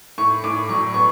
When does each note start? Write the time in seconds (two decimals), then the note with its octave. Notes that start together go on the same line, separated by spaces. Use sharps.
0.18 A2 C#6
0.44 A2 D6
0.69 F#3 C#6
0.94 B3 C#6